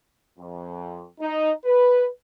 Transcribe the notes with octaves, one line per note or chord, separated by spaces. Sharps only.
F2
D#4
B4